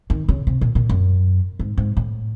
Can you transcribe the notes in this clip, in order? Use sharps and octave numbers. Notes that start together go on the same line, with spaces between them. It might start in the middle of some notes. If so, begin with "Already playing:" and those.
D#3
C#3
C3
A#2
A#2
F#2
G#2
G#2
A2